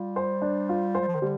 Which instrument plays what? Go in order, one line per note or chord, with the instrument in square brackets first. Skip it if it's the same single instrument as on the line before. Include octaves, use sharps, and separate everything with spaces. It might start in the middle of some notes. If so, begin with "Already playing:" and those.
Already playing: [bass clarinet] G3 [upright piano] F4
[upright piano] C5
D4
F4
C5
[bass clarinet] G3
F3
D#3
[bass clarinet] D3 [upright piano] G3